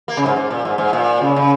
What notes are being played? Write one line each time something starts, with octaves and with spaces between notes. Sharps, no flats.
A#3
C#3
G#2
G#2
A#2
G#2
G#2
A#2
C#3
C#3